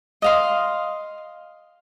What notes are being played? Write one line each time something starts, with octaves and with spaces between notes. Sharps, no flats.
D#5 F5 C6